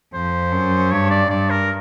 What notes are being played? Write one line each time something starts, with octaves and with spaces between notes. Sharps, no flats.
F2 C5
F#2
G2 C#5
D5
G2 D5
A#4